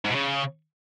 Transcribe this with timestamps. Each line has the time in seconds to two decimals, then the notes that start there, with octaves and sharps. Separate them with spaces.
0.05 G#2
0.10 B2
0.15 C#3